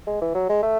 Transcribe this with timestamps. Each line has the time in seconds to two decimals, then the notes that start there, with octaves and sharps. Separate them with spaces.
0.07 G#3
0.21 E3
0.35 F#3
0.49 G#3
0.63 A3